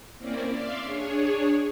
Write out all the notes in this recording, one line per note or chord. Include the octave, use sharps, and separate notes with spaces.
A#3 C4 C#4 E4 A#4 D5
D5 E5 F5 C6
D4 G#4 C#5